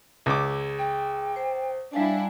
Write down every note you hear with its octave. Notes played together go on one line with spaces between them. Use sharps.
C#2 G#4 D6
G5
C5
G3 D4 E4 F5 G#5